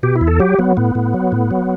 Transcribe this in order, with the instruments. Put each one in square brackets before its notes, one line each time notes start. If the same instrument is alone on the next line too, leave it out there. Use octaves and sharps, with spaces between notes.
[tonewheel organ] B2 G4
E4
E2
A4
F#3 G4
F#3 B3
A2 B3
A2
F#3
A2
F#3